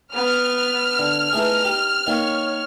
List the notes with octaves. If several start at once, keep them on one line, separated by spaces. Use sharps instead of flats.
B3 F6
D3
E3 A3 D#4 G#4
G4
D#3 A#3 C#5